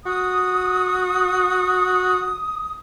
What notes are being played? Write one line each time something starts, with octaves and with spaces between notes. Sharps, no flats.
F#4 D#6